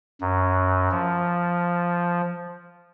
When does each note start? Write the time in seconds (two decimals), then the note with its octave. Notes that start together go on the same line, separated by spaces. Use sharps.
0.21 F#2
0.91 F3